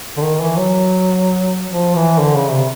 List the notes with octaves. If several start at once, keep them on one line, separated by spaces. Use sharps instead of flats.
D3
D#3
E3
F#3
F3
E3
D3
C#3
C3